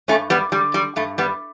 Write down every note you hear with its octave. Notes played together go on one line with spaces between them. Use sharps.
G2 A3 C#4
G3 B3
D3 G3
G3
G2 A3
G3 B3